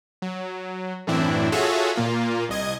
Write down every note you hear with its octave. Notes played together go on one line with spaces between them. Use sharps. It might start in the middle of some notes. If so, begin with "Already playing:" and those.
F#3
F#2 A2 E3 C4 D4 E4
F4 F#4 G#4 A4 C#5 E5
A#2 A#3 F4
C2 D#5 G#6